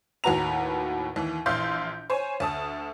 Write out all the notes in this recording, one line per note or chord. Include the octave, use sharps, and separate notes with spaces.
D#2 A2 F#4 B4 A#5 F7
D#2 E3
A#1 E3 E4 F5 C6 G6
C5 C#5 G#5
D2 A5 D#6